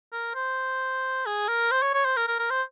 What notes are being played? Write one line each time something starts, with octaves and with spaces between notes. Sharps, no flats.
A#4
C5
G#4
A#4
C5
C#5
C#5
C5
A#4
A#4
A#4
C5